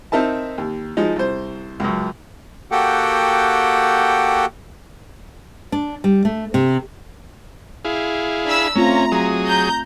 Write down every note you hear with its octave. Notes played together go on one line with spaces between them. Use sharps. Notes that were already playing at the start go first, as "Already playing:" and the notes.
C4 D#4 A#4 E5 A5
D#2
F3 G#3 D#4
C2 C5
C#2 F#2
A#3 F#4 G4 A4 F#5 G5
D4
G3
A3
C3
E4 G#4 F5
D4 B5 E6
A3 C4 C#4 F4 A#5
F#3 G#4 D#6
A#5 G6